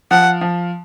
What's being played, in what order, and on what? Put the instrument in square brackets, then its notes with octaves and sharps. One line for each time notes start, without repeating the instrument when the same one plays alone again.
[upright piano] F3 [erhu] F#5
[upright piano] F3